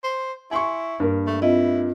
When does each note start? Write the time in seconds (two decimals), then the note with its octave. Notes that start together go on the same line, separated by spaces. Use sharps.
0.04 C5
0.51 E4 G#5 C6 C#6
1.00 G2 A#3 A#4
1.27 A3
1.42 C4 E4 F4 D#5